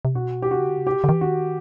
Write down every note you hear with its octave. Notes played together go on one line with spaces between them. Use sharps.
C3
B2 F#4
G4
C3 F#4
C#3
D3
C#3
C3 G4
D3
D#3
E3
D#3 F#4